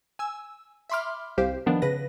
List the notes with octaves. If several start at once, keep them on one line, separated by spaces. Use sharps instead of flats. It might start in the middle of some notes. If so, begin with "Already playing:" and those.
G#5 E6
E5 B5 C6 D6 F6
C2 G4 C5 F5
D#3 F3 B3 D4
C#3 B4 A#6